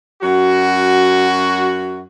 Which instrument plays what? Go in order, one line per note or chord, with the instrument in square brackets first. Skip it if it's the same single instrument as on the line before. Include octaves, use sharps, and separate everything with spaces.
[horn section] F#2 F#4